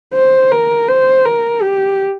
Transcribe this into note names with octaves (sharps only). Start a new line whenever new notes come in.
C5
A#4
C5
A#4
G4